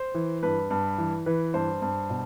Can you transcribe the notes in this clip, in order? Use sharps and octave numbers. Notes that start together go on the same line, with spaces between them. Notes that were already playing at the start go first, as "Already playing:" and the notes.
Already playing: C5
E3
G2 B4
G2
E3
E3 B4
G2 C5
G2
B2